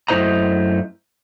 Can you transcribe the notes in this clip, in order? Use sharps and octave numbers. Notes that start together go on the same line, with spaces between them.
F#2 A3 E4 C5 D#5 A#5